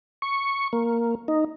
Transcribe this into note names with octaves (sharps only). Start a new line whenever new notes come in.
C#6
A#3
D#4